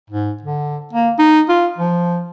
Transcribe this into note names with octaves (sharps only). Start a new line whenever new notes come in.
G#2
D3
A#3
D#4
F4
F3